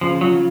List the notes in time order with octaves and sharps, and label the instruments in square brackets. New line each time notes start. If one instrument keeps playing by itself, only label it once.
[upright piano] C#3 [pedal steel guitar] F3
[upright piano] F3 [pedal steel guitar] F#3